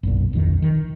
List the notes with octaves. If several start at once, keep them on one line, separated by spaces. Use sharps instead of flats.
F#1 B1 A#2
D1 A#1 F2 D#3
D#3